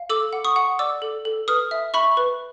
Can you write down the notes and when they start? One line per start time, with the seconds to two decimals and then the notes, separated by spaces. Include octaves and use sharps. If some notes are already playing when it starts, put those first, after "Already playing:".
Already playing: F5
0.10 A4 D6 E6
0.33 F#5
0.44 C#6 D#6
0.56 F#5
0.79 D5 D6 E6
1.02 A4
1.25 A4
1.48 B4 D#6 F6
1.71 E5
1.94 E5 B5 C#6
2.17 B4